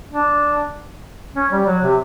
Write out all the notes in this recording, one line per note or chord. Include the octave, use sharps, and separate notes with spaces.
D4
C#4
G3
F#3
C3